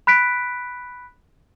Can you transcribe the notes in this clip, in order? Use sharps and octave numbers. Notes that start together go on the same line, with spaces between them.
B5 F#6 B6 D7